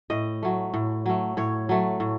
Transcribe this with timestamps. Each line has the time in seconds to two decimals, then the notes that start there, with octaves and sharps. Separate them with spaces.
0.10 A2 D#5
0.42 F#3 A3
0.74 A2
1.06 F#3 A3
1.37 A2 C#5
1.69 F#3 A3
2.00 A2